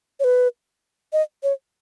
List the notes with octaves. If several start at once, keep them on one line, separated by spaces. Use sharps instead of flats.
C#5
B4
D#5
C#5